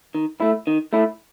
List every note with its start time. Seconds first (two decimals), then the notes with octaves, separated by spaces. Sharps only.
0.15 D#3
0.40 A3 E4
0.67 D#3
0.93 A3 E4